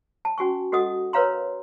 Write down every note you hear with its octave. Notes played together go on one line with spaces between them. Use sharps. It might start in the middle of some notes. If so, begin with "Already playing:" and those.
A5
C#4 F#4 G#5 C#6
F#4 A4 D#5 F#5 D#6
A#4 B4 C#5 F5 A#5 C6